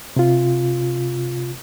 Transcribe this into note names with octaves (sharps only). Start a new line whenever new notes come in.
C3 F4